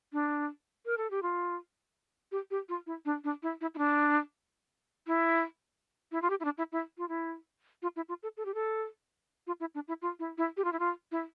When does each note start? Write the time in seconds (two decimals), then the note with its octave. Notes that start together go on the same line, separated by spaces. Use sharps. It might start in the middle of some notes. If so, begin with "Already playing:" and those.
0.13 D4
0.86 A#4
0.98 A4
1.11 G4
1.23 F4
2.32 G4
2.51 G4
2.69 F4
2.87 E4
3.05 D4
3.24 D4
3.43 E4
3.61 E4
3.75 E4
3.78 D4
5.07 E4
6.12 E4
6.22 F4
6.30 G4
6.40 E4
6.45 D4
6.58 E4
6.72 E4
6.98 F4
7.09 E4
7.82 F4
7.96 E4
8.09 F4
8.23 A4
8.37 A4
8.45 G4
8.54 A4
9.47 F4
9.60 E4
9.75 D4
9.88 E4
10.02 F4
10.19 E4
10.38 E4
10.57 G4
10.64 F4
10.73 E4
10.79 F4
11.12 E4